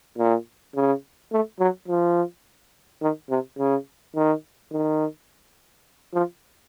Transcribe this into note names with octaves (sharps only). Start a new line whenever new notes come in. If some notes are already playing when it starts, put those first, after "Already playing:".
A#2
C#3
A3
F#3
F3
D#3
C3
C#3
D#3
D#3
F3